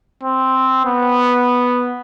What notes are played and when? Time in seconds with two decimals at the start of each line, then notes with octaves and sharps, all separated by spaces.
0.23 C4
0.86 B3